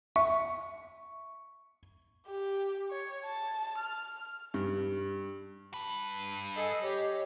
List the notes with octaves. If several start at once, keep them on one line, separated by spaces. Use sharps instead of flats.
E5 C#6
G4
C#5
A5
F6
G2
G2 B4 A5
G#4 A4 D#5
G4 C#5